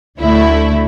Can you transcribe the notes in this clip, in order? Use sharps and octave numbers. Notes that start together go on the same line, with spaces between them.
D2 D3 A3 E4